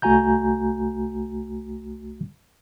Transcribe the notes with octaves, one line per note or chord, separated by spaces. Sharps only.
C2 A3 F#4 G#5 A#5 G6